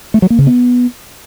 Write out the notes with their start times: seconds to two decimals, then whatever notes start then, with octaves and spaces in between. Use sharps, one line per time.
0.14 A3
0.22 F#3
0.30 A#3
0.39 C#3
0.47 B3